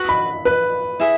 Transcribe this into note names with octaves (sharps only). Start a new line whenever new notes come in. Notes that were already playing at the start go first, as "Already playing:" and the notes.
Already playing: F#4 B4 F#5 C#6
B5
B4
E4 G#4 E5